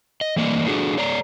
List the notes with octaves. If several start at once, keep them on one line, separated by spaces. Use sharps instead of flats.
D#5
E3 A3 A#3 D5 D#5
D4 F#4 G#4 A4
A4 C#5 D5 A#5